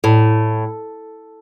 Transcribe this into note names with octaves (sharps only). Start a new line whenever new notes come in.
A2